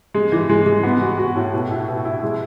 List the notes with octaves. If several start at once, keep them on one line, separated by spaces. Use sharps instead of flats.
G#3
E3
G#3
G#3
B3
F#4
F#4
A2
B2
E4
B2
E4
G#3